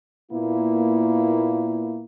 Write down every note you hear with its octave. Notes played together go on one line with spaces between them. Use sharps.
A#2 A#3 B3 E4